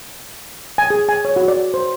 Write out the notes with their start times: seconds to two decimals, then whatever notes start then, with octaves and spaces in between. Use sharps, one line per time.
0.78 G#5
0.90 G#4
1.09 G#5
1.25 C#5
1.36 F#4
1.48 D5
1.74 C5